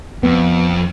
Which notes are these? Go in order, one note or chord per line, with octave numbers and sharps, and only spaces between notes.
F2 B3